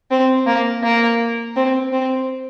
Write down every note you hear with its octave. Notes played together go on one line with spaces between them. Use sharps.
C4
A#3
A#3
C4
C4